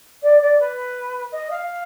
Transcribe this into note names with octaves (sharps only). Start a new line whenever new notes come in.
D5
D5
B4
D#5
F5